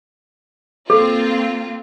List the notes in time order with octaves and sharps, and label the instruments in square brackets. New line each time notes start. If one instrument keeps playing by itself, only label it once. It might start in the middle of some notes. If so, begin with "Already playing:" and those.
[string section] A#3 C4 F4 [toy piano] A4